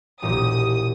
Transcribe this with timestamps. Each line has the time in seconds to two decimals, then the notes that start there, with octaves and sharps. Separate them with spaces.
0.22 E1 A#1 A#2 G4 D#6